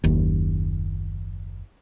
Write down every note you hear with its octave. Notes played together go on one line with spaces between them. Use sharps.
F#1 D#2